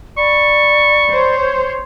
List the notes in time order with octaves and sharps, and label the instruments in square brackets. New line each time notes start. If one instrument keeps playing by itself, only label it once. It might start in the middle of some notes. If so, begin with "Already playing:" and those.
[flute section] D5 B5 [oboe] C#6
[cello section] C5 C#5